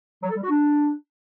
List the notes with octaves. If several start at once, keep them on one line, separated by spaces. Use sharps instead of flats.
F#3
A4
G3
F#4
D4